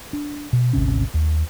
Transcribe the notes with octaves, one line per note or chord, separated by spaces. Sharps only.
D4
B2
G#1 D2 C3 C#4
D#2